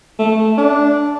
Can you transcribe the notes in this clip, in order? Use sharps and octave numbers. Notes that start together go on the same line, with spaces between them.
A3
D4